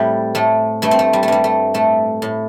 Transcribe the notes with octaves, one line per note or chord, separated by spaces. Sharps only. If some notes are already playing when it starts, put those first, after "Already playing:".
Already playing: A2 G3 A3 C4
A2 A3
G2 A3
C4
A3
G3
A3
G2 G3
A3
A2 A3
A2